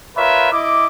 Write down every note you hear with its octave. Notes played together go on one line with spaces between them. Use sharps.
F4 A#4 B4 C#5 E5
E4 D#5 D6